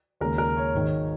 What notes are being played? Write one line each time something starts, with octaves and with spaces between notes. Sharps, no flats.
D#2 C#3 G#3 A#4
A#4
C#5
G#1 G#2 D#3 G#3